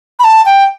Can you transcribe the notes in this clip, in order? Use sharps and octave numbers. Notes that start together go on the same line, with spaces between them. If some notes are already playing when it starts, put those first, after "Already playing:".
B5
A5
G5